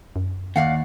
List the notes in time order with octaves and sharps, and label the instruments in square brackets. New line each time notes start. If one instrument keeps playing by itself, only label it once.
[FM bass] F#2
[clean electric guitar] D#2 [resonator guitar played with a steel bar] D5 F5 F#5